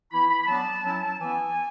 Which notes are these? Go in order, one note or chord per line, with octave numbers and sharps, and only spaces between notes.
E3 B3 E4 B5
B5
B5
F#3 B3 D4 A5
F#3 C#4 E4
E3 B3 E4 G#5